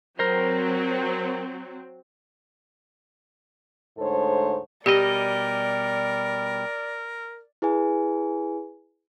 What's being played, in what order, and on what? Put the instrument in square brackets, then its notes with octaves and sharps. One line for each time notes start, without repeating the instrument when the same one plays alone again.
[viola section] F#3 C4 [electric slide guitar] A#4 C5
[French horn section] D2 G#2 A3 A4 C5 C#5
[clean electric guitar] B2 G3 D#5 [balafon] G4 [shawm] A#4 [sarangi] D5
[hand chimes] E4 G#4 B4 G#5